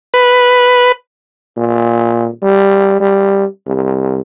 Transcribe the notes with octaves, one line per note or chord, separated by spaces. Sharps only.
B4
A#2
G3
G3
C2